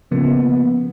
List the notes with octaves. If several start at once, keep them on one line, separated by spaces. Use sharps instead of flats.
C#3 F3 A#3 B3